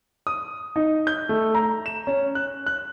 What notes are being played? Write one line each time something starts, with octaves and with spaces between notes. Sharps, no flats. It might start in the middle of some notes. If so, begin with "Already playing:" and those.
D#6
D#4
G6
A3
A#5
E7
C#4
F#6
F#6